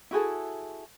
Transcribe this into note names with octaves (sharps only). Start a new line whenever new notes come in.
E4 F#4 G#4 A4